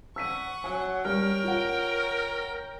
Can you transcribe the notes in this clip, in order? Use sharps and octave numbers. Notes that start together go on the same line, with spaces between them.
F#5 C#6 E6 B6 D#7
F#3 G#5
G3 A#4 C#5 G5 F6
F4 F#5